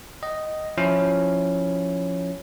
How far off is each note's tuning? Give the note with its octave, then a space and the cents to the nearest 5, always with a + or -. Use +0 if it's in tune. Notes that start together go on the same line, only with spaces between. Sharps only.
D#5 +0 G5 -40
F3 +5 C#4 +0 E4 +0